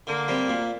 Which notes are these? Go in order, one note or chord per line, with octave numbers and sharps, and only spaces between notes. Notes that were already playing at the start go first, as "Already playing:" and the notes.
D3 A#3
G3 C4
A#2